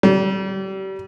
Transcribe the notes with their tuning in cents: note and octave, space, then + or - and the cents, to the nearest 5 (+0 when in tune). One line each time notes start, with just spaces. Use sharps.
G3 -35